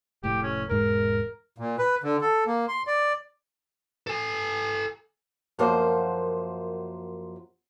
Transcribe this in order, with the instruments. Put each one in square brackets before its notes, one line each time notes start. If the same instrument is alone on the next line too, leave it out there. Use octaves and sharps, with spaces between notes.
[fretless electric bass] F1 A2 [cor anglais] G4
[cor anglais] C#4
[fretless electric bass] E1 G#2 G#3 [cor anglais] A#4
[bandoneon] A#2
B4
D3
A4
A#3
C6
D5
[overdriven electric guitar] A4 G#5
[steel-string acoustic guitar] F#2 F3 A#3 C5 F#5